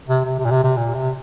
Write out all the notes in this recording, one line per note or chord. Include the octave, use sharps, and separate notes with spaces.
C3
C3
C3
A#2
C3
C3
A#2
C3